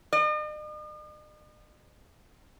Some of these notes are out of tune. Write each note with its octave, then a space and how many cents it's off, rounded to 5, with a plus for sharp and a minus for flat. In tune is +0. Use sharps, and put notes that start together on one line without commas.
D#5 -45